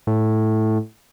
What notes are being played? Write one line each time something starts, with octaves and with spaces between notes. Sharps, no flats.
A2